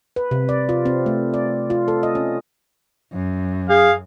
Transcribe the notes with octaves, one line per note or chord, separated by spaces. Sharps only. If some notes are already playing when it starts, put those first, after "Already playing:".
B4
C3
D5
F4
C4
A3
D5
F4
A4
D#5
C#4
F#2
G#4 F5